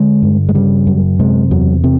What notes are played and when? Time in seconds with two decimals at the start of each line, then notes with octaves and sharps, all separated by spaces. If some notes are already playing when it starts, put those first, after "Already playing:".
Already playing: D3 G#3
0.23 G2
0.49 G#3
0.54 C#3 G3
0.87 F#2
1.19 C3 G#3
1.51 E2 F#3
1.84 C3 C4